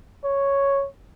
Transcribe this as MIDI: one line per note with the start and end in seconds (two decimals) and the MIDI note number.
0.24 0.86 73